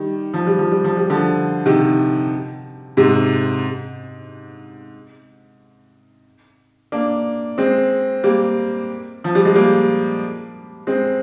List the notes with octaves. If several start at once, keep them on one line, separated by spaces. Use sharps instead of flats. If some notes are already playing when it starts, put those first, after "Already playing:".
Already playing: D#3 G3
F3
G3
F3
G3
F3
G3
D3 F3
C3 D#3
G#2 C3
A#3 D4
G#3 C4
G3 A#3
F3
G3
G#3
G3 A#3
G#3 C4